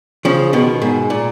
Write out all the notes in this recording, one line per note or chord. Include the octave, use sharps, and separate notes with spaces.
C#3 F3
B2 D#3
G#2 B2
A#2